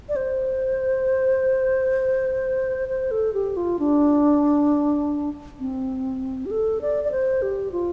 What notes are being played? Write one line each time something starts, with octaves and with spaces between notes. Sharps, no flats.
D5
C5
C5
A4
G4
F4
D4
C4
G4
A4
D5
D5
C5
G4
F4